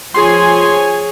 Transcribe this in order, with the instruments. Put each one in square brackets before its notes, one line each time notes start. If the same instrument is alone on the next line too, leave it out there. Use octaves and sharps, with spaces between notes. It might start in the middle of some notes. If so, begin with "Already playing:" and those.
[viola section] F3 G#5 [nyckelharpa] G#4 C#5 [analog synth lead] C6